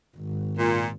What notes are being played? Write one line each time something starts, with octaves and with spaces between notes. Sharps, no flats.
G#1
A#2